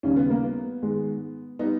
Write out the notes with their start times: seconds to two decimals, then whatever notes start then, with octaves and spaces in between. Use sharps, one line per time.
0.03 D#2 C#3 G3 C#4
0.16 B3
0.30 A#3
0.44 B3
0.82 G#2 D#3 G#3
1.59 G3 B3 D#4